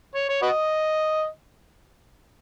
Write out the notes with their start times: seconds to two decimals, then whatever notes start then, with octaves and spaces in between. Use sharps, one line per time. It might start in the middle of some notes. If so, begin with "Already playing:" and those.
0.15 C#5
0.29 C#5
0.42 F#4 B4 D#5